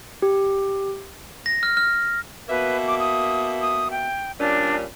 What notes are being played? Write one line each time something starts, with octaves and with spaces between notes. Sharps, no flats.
G4
A#6
F6
F6
B2 A#3 B4 E5
D6
D#6
D#6
G5
G2 A#2 C#4 D4